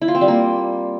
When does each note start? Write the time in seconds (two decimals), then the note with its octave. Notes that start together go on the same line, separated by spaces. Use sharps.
0.02 E4
0.08 F4
0.15 C4
0.21 G3
0.28 A#3